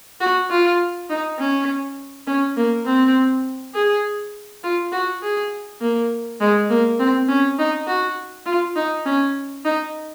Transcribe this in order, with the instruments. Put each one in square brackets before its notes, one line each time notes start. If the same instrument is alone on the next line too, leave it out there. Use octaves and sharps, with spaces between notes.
[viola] F#4
F4
D#4
C#4
C#4
A#3
C4
G#4
F4
F#4
G#4
A#3
G#3
A#3
C4
C#4
D#4
F#4
F4
D#4
C#4
D#4